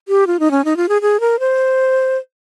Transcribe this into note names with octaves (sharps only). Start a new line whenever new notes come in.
G4
F4
D#4
C#4
D#4
F4
G#4
G#4
A#4
C5